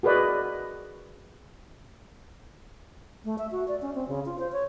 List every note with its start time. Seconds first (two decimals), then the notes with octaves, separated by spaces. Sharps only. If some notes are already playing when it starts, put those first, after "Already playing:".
0.03 F#4 G#4 A#4 B4 D5 D#5
3.25 A3
3.38 E5
3.51 F#4
3.68 D5
3.82 C#4
3.95 C4
4.08 C#3
4.26 F4
4.39 C5
4.52 C#5